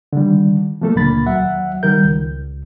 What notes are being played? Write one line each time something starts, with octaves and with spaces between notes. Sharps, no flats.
D3 D#3 G3
F3 F#3 A3 A#3 A4
C#2 A#2 D3 A#3 B5 A6
D#2 F#3 E5 F#5
D#3 G3 A#4 G6
C#2